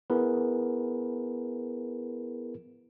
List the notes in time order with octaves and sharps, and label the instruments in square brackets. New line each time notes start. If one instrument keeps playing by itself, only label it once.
[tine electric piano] B3 E4 G#4 A#4 B4